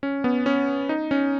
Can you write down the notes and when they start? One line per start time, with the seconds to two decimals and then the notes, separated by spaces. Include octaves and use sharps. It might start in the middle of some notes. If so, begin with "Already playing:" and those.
0.03 C#4
0.24 B3
0.46 C#4
0.89 D#4
1.11 C#4